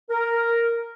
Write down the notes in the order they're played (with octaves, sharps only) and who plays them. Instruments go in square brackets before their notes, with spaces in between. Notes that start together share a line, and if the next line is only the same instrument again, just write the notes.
[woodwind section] A#4